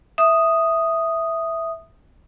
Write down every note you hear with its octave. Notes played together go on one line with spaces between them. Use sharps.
E5 D#6